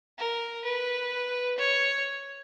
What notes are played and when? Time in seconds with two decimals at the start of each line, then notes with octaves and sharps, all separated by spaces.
0.18 A#4
0.65 B4
1.58 C#5